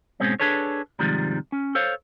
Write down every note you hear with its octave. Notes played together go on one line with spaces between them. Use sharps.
G#2 B2 G#3 C4 C#4
D4 G#4 A4 B4 C#5
G#2 C3 D#3 F3 G3 G#3
C#4
A4 C5 C#5 F5